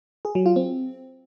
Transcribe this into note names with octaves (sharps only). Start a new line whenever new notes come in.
G#4
F#3
F4
C4